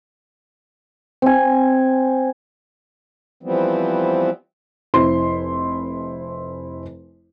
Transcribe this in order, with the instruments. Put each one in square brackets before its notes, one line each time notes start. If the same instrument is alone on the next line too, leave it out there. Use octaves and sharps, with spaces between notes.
[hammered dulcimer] C4 G#5
[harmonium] E3 F3 G3 B3 C4
[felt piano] F1 E4 C5 C6